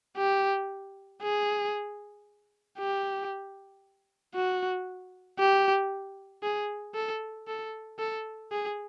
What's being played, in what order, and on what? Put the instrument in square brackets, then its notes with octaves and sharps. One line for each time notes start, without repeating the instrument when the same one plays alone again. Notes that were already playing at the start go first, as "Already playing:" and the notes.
[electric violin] G4
G#4
G4
F#4
G4
G#4
A4
A4
A4
G#4